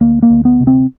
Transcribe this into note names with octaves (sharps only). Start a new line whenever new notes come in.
D2 A#3
A#3
D2
B3
C3
C4